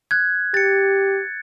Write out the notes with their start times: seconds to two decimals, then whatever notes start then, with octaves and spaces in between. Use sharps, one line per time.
0.11 F#6 G#6
0.54 G4 A6 C#7